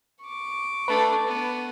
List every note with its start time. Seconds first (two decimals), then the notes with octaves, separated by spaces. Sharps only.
0.25 C#6 D6
0.88 A3 D4 B4
1.26 B3